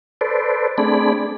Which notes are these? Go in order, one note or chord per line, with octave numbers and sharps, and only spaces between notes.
A4 B4 C5 D5
A3 C4 D4 G#4 D5 B5